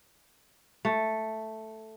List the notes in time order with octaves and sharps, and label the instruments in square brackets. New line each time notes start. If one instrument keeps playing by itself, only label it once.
[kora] A3